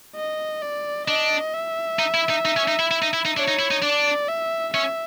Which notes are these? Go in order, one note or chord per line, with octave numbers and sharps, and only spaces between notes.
D#5
D5
D4 D#5
E5
D#4
E4
D#4
D#4
C#4
D#4
E4
E4
D#4
E4
D#4
D4 C#5
D#4
E4
D#4
D4 D5
E5
C#4 E5